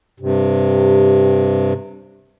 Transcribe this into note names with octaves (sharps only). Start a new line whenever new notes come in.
G2 C3